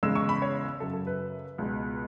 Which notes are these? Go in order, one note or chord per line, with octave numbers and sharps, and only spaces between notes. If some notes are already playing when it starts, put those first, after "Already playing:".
E2 C#3 G#3 E6
C#6
B5
C#5
F#2 C#3 F#3 A4
A4
B4
C#2 B2 G#3